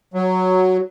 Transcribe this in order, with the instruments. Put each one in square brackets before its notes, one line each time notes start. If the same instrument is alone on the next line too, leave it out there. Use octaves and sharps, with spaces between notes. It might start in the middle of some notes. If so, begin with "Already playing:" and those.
[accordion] F#3